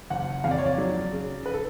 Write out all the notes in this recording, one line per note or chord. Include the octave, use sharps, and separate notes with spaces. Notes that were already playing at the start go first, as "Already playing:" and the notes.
F#1 F#5
F2 F5
D5
C#5
D5
F#3
C#3
B4
A4